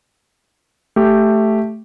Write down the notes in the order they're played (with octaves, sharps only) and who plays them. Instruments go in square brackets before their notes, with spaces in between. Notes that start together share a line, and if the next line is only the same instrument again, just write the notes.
[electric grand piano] A3 G4